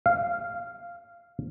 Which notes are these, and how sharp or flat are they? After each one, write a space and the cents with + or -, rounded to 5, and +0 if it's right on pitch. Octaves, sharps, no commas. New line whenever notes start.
F5 -10